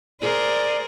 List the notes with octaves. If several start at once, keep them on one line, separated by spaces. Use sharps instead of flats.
G#4 A#4 C5 D5